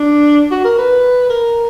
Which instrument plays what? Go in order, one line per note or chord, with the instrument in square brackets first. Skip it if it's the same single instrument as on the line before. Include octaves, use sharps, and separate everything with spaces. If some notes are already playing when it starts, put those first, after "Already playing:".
Already playing: [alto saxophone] D4
F#4
A#4
B4
A#4